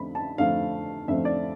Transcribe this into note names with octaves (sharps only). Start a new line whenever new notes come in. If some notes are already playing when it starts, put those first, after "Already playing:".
Already playing: F2 D3 A3 C4 B5
A5
F2 D3 A3 C4 F5
F2 D3 A3 C4 E5
D5